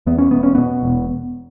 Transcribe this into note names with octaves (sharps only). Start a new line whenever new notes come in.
E2 B3
C#4
E1 B3
C#4
B2 B3
E1